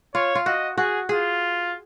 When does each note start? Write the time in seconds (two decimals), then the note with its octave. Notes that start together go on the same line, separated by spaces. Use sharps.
0.15 F4 C#5
0.35 F4
0.46 F#4 D#5
0.77 F#4 G#4
1.09 F4 G#4